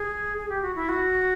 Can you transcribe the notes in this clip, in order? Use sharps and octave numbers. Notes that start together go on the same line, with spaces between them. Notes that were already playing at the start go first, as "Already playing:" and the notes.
Already playing: G#4
G#4
G4
F#4
E4
F#4